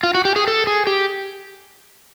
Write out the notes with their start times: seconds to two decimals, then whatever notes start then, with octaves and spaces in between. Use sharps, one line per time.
0.03 F4
0.15 F#4
0.25 G4
0.36 G#4
0.48 A4
0.67 G#4
0.87 G4